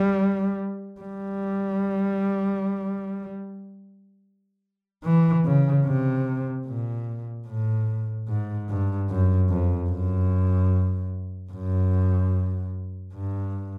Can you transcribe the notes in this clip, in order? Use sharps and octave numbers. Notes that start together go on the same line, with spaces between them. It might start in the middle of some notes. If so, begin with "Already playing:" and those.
Already playing: G3
G3
E3
C#3
C3
A#2
A2
G#2
G2
F#2
F2
F#2
F#2
G2